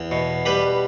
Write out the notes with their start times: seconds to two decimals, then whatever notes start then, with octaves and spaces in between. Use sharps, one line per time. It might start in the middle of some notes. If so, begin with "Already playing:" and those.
Already playing: E2
0.11 B2
0.46 G3 G4 B4